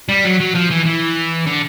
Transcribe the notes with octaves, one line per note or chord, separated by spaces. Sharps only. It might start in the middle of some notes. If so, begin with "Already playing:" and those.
G3
F#3
F#3
F3
E3
E3
D3